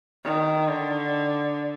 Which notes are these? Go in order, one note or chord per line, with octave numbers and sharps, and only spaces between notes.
D#3
D3